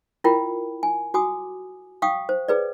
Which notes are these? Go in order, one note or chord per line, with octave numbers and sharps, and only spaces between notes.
E4 F4 A#4 G5 B5
G#5
F#4 G#5 D6 D#6
F5 G5 C#6 D#6
C5
G#4 B4 D5